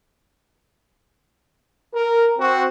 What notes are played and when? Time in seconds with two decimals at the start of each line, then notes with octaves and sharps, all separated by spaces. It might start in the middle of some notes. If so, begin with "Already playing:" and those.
1.93 A#4
2.37 C4 F#4